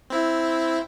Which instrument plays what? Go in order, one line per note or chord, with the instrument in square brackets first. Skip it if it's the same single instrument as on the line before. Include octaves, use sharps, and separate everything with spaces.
[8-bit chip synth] C4 E4